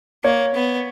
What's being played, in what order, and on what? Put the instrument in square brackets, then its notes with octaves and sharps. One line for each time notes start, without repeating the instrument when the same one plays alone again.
[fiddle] A#3 [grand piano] C#5
[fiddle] B3